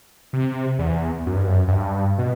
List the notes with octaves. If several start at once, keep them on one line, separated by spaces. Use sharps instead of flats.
C3
E2
F#2
G2
F#2
F#2
G2
B2